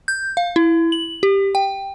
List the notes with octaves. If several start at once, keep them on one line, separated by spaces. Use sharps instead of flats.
G6
F5
E4
F#7
G4
G5